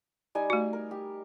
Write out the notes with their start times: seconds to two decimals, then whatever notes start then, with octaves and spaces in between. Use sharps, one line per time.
0.35 G3 D#4 G#5
0.50 A3 F#4
0.73 A#4
0.91 G4